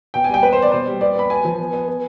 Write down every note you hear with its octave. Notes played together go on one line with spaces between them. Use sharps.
B2 G5
G#5
G3 G5
B3 B4
C5
B3 D5
B2 C5
G3
B3 D5
B3 B5
B3 G#5
F3
B3
B3
B3